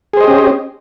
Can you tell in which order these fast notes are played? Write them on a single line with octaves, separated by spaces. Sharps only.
G#4 C5 D#5 G4 C#4